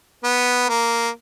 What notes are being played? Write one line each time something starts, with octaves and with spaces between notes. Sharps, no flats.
B3
A#3